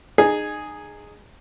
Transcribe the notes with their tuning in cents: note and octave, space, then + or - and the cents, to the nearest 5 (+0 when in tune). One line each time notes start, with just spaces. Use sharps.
D#4 -30 G#4 +0